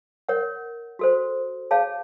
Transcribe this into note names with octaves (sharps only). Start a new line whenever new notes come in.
A#4 C#5 F#5
F#4 A4 C5
G#4 C#5 F5 A5